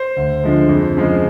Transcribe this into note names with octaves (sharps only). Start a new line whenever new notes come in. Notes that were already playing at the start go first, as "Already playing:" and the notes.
Already playing: C5
D2
D3 F3 G#3
F2
C#3 F3 G#3